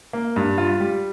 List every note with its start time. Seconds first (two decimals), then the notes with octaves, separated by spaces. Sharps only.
0.13 A#3
0.36 G2
0.58 F4
0.80 G3